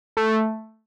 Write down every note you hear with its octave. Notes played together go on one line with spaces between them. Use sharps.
A3